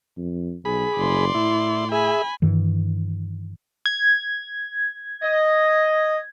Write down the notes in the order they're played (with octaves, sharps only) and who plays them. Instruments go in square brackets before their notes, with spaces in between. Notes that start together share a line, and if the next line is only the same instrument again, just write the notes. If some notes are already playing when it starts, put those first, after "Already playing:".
[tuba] F2
[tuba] B1 [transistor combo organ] G#4 B5
[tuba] F#1 [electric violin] D5 C6
[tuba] A2 [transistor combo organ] E4
[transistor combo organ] G#4 E5 [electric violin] G#5 B5
[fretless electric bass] G2 D#3 E3
[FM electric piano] G#6
[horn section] D#5